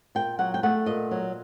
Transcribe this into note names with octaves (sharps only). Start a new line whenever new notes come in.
A#2 G5
F#3 F#5
G5
A3 F#5
A#2 D#5
F#3